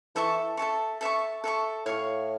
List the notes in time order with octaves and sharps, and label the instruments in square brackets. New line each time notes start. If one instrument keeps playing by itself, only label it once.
[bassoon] E3 [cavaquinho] A4 E5 A5 C#6
[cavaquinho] A4 E5 A5 C#6
A4 E5 A5 C#6
A4 E5 A5 C#6
[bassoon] A2 [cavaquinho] C#5 F5 C#6